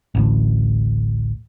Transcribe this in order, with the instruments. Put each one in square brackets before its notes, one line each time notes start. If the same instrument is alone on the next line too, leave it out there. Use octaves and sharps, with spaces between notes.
[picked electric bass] A1 D2 A2